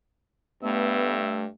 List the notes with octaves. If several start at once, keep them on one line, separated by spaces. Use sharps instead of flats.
G2 A3 B3 E5